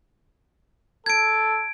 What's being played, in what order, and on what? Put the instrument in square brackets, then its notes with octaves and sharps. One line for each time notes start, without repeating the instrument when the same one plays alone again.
[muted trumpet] A4 [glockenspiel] G#6 D7